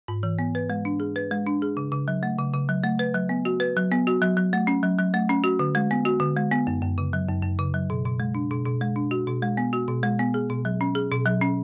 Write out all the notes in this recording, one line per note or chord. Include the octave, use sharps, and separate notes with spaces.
G#2
E3
B3
B4
G#3
D4
G#4
B4
G#3
D4
G#4
C#3
C#3
F#3
A3
C#3
C#3
F#3
A3
B4
F#3
B3
F#4
B4
F#3
B3
F#4
F#3
F#3
A3
C#4
F#3
F#3
A3
C#4
F#4
D3
G#3
B3
F#4
D3
G#3
B3
F#2
F#2
C#3
F#3
F#2
F#2
C#3
F#3
B2
B2
G#3
D4
B2
B2
G#3
D4
F#4
B2
G#3
B3
F#4
B2
G#3
B3
G#4
B2
F#3
C#4
G#4
B2
F#3
C#4